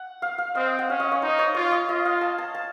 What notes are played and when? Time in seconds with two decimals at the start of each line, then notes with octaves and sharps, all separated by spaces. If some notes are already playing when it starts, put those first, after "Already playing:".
Already playing: F#5
0.22 F5
0.38 F5
0.55 C4 D#5
0.79 F#5
0.89 C#4 F5
1.00 D#5
1.12 C#5
1.22 D#4 C5
1.39 C#5
1.55 F4 C#5
1.71 D#5
1.88 F4 D#5
2.05 F5
2.21 A5
2.38 A5
2.55 A5